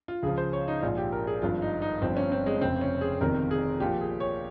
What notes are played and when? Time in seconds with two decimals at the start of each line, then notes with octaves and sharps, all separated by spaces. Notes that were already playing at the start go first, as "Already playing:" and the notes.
0.08 F4
0.23 C#2 C#3 F3 G#4
0.37 C5
0.53 C#5
0.68 D#4
0.82 A#1 G#2 F3 F4
0.97 G4
1.12 A#4
1.27 G#4
1.42 G#1 G2 F3 F4
1.62 D#4
1.82 D#4
2.02 G1 G2 F3 C4
2.17 C#4
2.32 C4
2.46 G#3
2.61 F1 F2 C#3 C4
2.81 C#4
3.01 G#4
3.21 G1 F2 C3 D#3 A#4
3.51 G#4
3.80 A#1 A#2 F3 G4
4.01 G#4
4.20 C#5